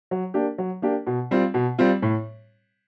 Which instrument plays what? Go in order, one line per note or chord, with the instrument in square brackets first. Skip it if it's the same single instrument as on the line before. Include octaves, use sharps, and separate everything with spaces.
[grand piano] F#3
A#3 D4 G4
F#3
A#3 D4 G4
B2
G3 C4 F4
B2
G3 C4 F4
A2